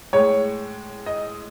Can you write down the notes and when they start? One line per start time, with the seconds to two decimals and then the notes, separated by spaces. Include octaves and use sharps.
0.13 A2 G#3 C#5
1.06 D#5